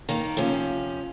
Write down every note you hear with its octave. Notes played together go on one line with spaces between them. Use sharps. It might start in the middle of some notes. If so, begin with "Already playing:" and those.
D#3 A#3
C3 F3 C#4